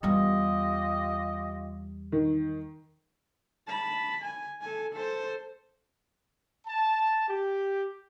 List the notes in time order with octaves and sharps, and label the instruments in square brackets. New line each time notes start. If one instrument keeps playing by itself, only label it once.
[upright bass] E2 G3 [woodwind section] F4 G4 D#5
[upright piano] D#3
[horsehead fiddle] A5 B5
G#5
A4 G#5
A4 C5
[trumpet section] A5
G4